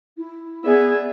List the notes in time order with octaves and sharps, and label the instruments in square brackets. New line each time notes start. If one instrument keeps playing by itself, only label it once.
[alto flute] E4
[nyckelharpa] B3 E5 [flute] G#4 [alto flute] D5